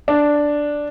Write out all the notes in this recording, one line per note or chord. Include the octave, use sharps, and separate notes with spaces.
D4